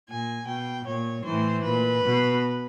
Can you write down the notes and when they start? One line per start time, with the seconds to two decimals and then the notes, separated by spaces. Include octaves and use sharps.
0.09 A#2 G#5
0.47 B2 G5
0.86 A#2 C#5
1.24 A2 E3 C5
1.64 A#2 B4
2.03 B2